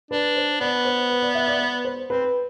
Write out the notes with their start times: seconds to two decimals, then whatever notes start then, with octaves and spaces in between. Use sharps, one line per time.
0.11 D4 B4
0.36 C5
0.60 B3 D5
0.85 C5
1.10 B4
1.22 D5
1.35 E5
1.48 D5
1.59 B4
1.85 C5
2.10 C4 B4